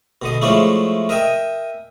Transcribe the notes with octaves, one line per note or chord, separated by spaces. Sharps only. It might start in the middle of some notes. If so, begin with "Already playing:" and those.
B2 D3 D#5
F3 G#3 A3 C#4 D4 E4
A#4 D#5 E5 G5 G#5